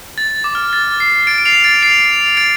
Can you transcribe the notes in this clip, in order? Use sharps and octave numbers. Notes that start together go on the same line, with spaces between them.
A6
D6
F6
A6
C7
A6 D7
D7
C7 F7
A6 D7
C7 F7
A6 D7